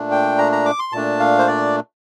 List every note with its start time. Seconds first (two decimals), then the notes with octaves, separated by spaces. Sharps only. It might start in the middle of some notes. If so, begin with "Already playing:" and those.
Already playing: A#2 A3 D4
0.11 G5
0.38 A#5
0.52 A#5
0.66 D6
0.79 C6
0.93 A#2 A3 D4 A5
1.20 F5
1.39 C5
1.47 D5